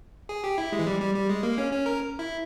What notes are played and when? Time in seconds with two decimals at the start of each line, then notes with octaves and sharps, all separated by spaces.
0.29 G#4
0.44 G4
0.58 E4
0.72 G#3
0.79 E3
0.87 G3
1.01 G3
1.15 G3
1.29 G#3
1.43 A#3
1.58 C#4
1.72 C#4
1.86 A#4
2.19 E4